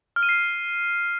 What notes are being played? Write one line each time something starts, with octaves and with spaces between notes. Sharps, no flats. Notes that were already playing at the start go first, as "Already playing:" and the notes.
F6
D#7
C7